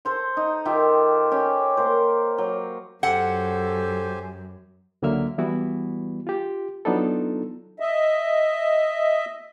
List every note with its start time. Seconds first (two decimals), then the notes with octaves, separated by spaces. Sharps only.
0.05 A4 C5 C6
0.37 D#4
0.65 D#3 F4 G4 E5
1.31 C#4 G4
1.77 A#3 A#4 C5
2.38 F#3
3.03 F#2 G4 A4 C5 F#5 G#5
5.02 C#2 D3 F#3 A#3 E5 F6
5.38 E3 G3 B3 E4 F#4
6.27 F4 G4
6.85 F#3 B3 D4 D#4 F4 A4
7.80 D#5 E5